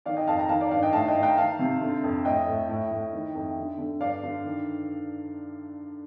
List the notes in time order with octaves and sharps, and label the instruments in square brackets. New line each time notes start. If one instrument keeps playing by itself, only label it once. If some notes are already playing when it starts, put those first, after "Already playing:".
[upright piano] D#3 D5 F5
D#5 G5
F2 F5 A5
G5 A#5
D#3 F5 A5
D5 F5
G2 D5 F5
D#5 G5
A2 F5 A5
D#5 G5
A2
G5 A#5
D#3 F5 A5
C3
D3
F2
A2 D#5 G5
A2
A2
A2
D#3
F2
D3
D3
G2 D5 F5
D3
D#3